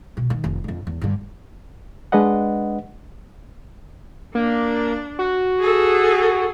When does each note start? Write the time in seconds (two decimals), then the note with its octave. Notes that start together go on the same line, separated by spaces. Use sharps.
0.17 B2
0.30 D#3
0.44 F1
0.64 F2 D3
0.87 E2
1.01 G2 D3
2.12 G#3 D4 B4 D#5 F#5
4.35 A#3 D4
5.19 F#4
5.60 G#4 A4